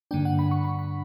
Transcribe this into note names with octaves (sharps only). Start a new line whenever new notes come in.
G2 D3 A#3 D4 G5
F#5
B5
C#6
B5
B5